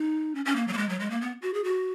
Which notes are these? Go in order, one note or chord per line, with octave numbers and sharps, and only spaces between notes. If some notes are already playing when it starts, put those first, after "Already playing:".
Already playing: D#4
C#4
C#4
A#3
F#3
A#3
G#3
F#3
G#3
A#3
B3
F#4
G#4
F#4